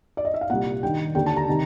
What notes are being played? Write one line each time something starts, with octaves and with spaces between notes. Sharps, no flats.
D5
D#5
E5
F5
C2 A#2 F#5
G2 D#3 G5
D#2 D3 G5
A5
A#5
C3 D#3